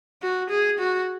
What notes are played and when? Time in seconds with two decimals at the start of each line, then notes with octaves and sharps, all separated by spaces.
0.22 F#4
0.50 G#4
0.79 F#4